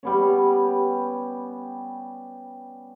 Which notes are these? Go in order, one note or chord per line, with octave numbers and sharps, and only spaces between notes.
G3 B3 C#4